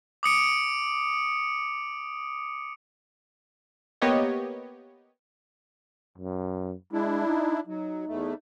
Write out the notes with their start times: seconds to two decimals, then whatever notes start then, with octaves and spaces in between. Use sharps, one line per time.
0.23 D6 D#6 C#7 D7
4.02 A#3 B3 G4 C#5 D#5
6.18 F#2
6.93 G#3 D4 E4
7.26 D#4
7.67 F#3 D#4
8.08 E2 A3